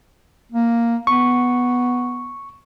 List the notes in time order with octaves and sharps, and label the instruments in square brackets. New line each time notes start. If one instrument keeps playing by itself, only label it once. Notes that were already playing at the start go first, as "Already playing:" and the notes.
[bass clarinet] A#3
[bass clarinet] B3 [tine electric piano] C#6